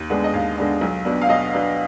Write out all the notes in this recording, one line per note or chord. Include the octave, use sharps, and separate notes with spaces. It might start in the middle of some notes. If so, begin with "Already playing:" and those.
Already playing: D#2
D3 G#3 B3 D4
D#5
D#2 F5
D3 G#3 B3 D4
B1
B2 B3 D4
F5
B1 D#5
B2 B3 D4